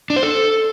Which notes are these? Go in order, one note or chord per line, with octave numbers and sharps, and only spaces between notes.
D4
C5
A4